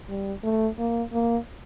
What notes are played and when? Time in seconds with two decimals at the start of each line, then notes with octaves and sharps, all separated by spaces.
0.08 G3
0.44 A3
0.79 A#3
1.13 A#3